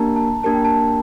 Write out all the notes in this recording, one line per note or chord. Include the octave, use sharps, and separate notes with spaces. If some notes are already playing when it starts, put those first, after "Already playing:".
Already playing: A#3 D4 G4 A#4 A5 A#5
A5
A#3 D4 G4 A#4 A5
G5
A5